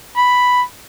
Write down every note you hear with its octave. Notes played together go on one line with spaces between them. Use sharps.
B5